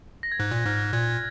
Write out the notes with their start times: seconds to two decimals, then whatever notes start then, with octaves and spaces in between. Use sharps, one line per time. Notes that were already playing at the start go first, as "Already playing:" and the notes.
0.23 A#6
0.32 G#6
0.39 G#2 F#6
0.51 A#2
0.65 G#2 F6
0.93 A#2 G#6